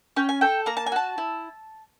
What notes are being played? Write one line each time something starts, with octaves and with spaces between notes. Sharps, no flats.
C#4 G5
G#5
A4 G5
A#3 A#5
A5
G#5
F#4 A5
E4